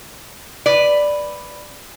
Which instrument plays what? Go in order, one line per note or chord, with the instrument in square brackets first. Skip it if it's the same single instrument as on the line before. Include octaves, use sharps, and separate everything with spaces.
[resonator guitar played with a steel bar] B4 D5